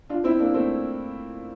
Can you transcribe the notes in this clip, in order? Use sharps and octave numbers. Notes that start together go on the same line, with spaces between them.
D4 F4
C4 E4
A#3 D4
A3 C4